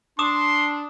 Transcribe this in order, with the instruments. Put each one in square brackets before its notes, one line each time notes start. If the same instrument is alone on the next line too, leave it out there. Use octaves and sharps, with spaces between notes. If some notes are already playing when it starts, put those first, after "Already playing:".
[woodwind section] D4 [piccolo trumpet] C6 [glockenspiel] D6 D#6 E7